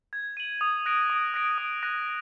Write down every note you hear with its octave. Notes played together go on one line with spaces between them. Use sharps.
G#6
D#7 F#7
D#6
F#6 A#6 D7
D#6
F#6 A#6 D7
D#6
F#6 A#6 D#7